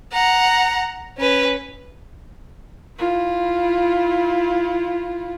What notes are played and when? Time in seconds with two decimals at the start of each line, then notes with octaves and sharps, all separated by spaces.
0.13 F#5 A#5
1.18 C#4 B4
2.98 E4 F4